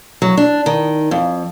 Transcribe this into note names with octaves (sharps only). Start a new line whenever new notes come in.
F#3
D4
D#3
F2